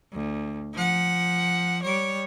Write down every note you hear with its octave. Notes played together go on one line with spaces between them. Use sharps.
D2
F3 F#5
G3 C#5